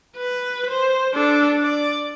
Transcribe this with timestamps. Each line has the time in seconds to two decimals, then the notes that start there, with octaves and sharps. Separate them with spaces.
0.17 B4
0.70 C5
1.14 D4 A4
1.62 D5